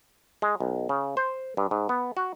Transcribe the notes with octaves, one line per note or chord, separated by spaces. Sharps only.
G#3
B1
C#3
C5
G2
G#2
B3
F#4